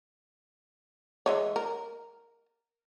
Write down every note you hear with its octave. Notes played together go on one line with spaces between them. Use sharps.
E3 G#3 C#5
A#4